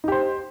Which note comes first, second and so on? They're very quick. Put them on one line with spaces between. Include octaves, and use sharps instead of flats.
D#4 G4 C5